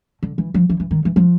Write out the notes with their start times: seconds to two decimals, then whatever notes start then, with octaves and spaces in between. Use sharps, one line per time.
0.23 D3
0.38 E3
0.54 F3
0.69 E3
0.80 E3
0.91 D#3
1.05 E3
1.16 F3